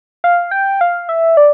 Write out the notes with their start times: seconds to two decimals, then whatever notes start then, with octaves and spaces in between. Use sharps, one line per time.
0.24 F5
0.51 G5
0.81 F5
1.09 E5
1.37 D5